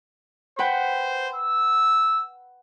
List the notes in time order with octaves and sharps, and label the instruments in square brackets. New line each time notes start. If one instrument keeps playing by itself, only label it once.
[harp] B4 F#5 G5 [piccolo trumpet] C5
[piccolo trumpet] E6